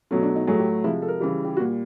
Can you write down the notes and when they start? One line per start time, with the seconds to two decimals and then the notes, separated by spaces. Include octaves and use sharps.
0.11 B2 F#3 A3 C#4
0.23 D4
0.36 D#4
0.47 A2 F#3 A3 G#4
0.59 G4
0.84 C3 F3 G#3 E4
1.02 A4
1.08 A#4
1.20 C#3 E3 G3
1.45 G4
1.57 A#2 G3 F#4